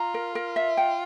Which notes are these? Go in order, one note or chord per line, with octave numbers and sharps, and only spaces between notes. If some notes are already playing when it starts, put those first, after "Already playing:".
Already playing: F4 A#5
A#4
A#4
E5
G5